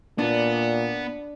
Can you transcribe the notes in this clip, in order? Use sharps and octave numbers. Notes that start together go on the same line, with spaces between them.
A#2 B3 D4